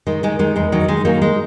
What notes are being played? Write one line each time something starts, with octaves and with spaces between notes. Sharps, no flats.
D#3 G#3
D#3 G#3
D#3 G#3
E2 G#3
D#3 F#3
D#3 G#3
D#3 F#3 A#3
G#3